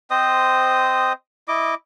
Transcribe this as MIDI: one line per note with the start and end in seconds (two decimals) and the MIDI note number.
0.11 1.13 60
0.11 1.13 72
0.11 1.13 75
0.11 1.13 87
1.48 1.74 64
1.48 1.74 75
1.48 1.74 86